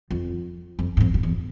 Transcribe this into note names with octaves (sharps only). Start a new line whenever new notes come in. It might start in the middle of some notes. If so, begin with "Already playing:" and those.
F2
F2
G#2
F2
F2
E2